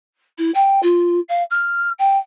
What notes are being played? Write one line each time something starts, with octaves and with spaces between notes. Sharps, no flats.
E4
G5
F4
F5
F6
G5